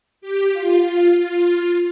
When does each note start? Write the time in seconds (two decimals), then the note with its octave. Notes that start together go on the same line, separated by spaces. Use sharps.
0.21 G4
0.53 F4
1.15 F4